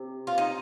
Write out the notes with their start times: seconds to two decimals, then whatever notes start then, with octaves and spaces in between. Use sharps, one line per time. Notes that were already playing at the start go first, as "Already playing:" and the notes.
Already playing: C3
0.27 F4
0.38 D#4